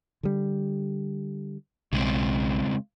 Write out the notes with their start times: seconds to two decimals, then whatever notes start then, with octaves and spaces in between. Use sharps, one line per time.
0.23 D3 G3
1.93 B1 C#3 G#3 C4